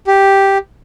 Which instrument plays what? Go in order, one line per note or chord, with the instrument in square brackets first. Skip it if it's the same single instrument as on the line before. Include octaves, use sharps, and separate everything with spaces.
[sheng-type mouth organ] G4